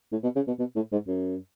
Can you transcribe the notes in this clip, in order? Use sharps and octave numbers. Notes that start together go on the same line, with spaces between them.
A2
B2
C#3
B2
B2
A2
G#2
F#2